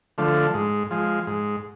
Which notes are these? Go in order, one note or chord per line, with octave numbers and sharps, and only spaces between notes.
D3 F3 A3
G#2
F3 G#3
G#2